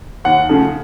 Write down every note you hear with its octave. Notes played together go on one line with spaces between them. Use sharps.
D#2 F#5
C#3 F3 A3